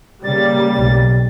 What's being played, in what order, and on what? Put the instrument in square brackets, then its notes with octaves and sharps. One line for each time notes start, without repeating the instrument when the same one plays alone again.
[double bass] C#3 [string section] G3 A#3 [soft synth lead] A6
[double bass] B1